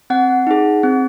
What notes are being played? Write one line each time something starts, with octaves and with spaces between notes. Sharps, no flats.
C4 F#5
D#4 G#4
C4